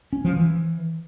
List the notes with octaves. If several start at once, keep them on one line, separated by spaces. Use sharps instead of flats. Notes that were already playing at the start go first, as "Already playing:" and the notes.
C#4
F3
E3